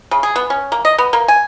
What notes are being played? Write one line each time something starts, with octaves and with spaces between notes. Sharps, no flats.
C#3
G#4
B3
C#4
A#3
D#5
B3
A#3
G#5